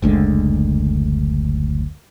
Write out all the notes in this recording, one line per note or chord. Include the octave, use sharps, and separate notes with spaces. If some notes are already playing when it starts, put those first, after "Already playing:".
F#1 D2 D3 G#3